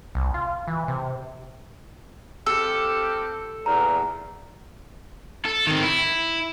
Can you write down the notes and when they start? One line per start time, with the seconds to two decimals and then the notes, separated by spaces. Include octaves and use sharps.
0.15 C2
0.34 F4
0.68 E3
0.88 C3
2.46 C4 F4 G4 A4 E6
3.66 E2 A#2 A#5
5.45 A4
5.67 D#3 C4
5.83 E4